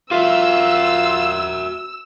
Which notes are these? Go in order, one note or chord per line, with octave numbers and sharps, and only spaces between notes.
F4 F#4 A#4 E5 E6